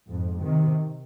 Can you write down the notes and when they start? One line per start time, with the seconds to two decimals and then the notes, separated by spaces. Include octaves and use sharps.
0.10 F2 G#2
0.44 C3 D#3